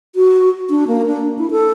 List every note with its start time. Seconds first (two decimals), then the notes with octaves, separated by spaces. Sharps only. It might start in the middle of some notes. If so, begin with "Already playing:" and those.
0.15 F#4
0.70 D4
0.88 A#3
1.06 D4
1.38 E4
1.51 A4